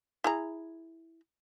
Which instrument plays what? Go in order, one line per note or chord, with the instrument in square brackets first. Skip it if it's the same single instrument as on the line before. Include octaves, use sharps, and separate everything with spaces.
[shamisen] E4 G#4 A#5